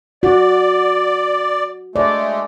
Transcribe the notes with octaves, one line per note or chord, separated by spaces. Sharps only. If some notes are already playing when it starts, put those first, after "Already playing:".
F#4 D5
G#3 A3 D5